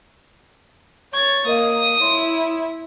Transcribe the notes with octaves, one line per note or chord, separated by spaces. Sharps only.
C#5 C#6 G#6 A6
A#3 A#4 D#5 F5 D#6
E4 C#5 C6